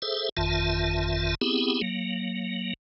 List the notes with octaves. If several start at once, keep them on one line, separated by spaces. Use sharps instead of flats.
G#4 A4 C5 E5
G1 F2 D#3 F4 E5 A5
B3 C4 E4 G4 G#4
F#3 A#3